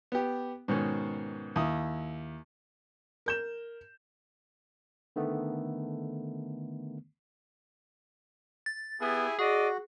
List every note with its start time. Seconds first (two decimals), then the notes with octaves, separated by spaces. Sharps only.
0.12 B3 G4
0.68 G#2 B2 D#3 C#4
1.56 D#2 E4 D#6
3.26 A#4 G6 E7
5.16 D3 D#3 A3 B3
8.66 A6
9.01 B3 E4 G4 G#4
9.39 F#4 G#4 D5 D#5